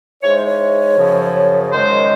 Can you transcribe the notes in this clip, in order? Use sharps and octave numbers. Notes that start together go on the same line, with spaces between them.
G#2 E3 G#3 C#5
C5
C#5
F#2 C#3 F3
F#2 D#3 G#3 C5